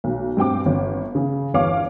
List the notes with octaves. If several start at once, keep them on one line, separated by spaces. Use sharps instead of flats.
B1
G2 C4 G5 D6
G1
C#3
G1 E2 C#5 F5 D6